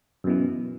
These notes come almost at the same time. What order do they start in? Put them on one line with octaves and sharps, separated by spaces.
F#2 B2 E3